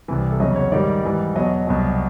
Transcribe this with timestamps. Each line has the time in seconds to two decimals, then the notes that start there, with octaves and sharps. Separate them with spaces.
0.08 C2 C3 E3
0.30 A4
0.40 E2 C#3 F#3 D#5
0.56 C#5
0.72 G#2 D#3 G3 D5
1.03 G#2 E3 G3
1.36 E2 B2 F#3 D#5
1.67 C2 B2 F#3